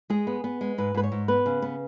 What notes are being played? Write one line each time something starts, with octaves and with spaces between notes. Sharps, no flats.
G#3 G#4
B3
B3
G#3
G#2 B4
G#2 B4
C#5
G#2
B3 B4
C#3
B3